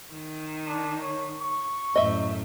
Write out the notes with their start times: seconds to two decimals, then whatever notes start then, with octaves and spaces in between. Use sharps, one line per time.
0.12 D#3
0.67 D4
1.02 C#5
1.41 C#6
1.96 F#2 A2 D#5 E5